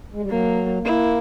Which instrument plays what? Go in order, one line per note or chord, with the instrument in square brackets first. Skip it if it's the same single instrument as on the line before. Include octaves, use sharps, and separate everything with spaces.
[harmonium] G#3
G3
[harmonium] F#3 [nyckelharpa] A#3
[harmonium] A#3 [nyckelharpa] E4